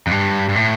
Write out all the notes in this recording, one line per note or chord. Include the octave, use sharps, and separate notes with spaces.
F2
G2
G2
A2